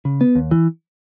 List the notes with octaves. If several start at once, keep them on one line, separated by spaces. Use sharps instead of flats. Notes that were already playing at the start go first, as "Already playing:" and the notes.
C#3
B3
D#2
E3